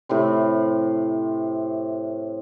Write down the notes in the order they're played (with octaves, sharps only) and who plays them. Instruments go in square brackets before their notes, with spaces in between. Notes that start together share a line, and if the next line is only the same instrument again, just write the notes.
[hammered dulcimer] A2 C3 C4